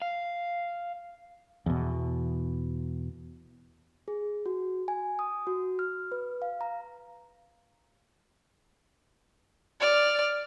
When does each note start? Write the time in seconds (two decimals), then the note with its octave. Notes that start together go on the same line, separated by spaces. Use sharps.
0.02 F5
1.66 E2 B2
4.08 G#4
4.46 F#4
4.88 G#5
5.19 D#6
5.47 F#4
5.79 F6
6.12 B4
6.42 F5
6.61 A#5
9.81 D5 F6